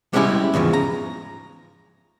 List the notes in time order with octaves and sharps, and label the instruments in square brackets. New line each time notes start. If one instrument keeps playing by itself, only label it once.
[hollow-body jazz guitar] G3 G#3 B3 C#4 E4 G4
E2 G#2 C#3 F3
A#5